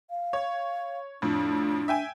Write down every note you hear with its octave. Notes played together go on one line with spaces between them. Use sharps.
F5
C#5
F2 A2 D4
E5 G5 G#5